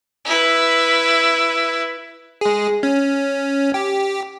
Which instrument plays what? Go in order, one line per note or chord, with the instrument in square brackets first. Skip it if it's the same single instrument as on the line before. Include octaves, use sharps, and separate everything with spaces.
[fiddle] E4 B4
[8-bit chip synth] G#3 G#4
C#4
G4